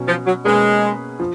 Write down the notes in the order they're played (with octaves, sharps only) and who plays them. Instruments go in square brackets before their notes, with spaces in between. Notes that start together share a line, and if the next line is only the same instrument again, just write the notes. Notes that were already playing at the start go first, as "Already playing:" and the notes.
Already playing: [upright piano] B2 F#3 C#4
[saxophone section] F3
F#3
[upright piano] B2 A#3 C#4 G#4 B4 [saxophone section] G#3
[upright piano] F3